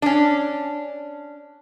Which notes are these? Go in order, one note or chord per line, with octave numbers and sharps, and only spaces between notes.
C#4 D4